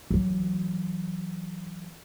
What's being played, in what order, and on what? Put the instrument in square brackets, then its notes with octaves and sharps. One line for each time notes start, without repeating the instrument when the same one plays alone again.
[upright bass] E3 F#3